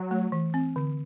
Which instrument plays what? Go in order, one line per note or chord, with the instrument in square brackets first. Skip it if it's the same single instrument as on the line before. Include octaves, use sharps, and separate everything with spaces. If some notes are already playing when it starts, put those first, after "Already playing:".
Already playing: [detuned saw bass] F#3
[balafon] A3
E3
C4
D3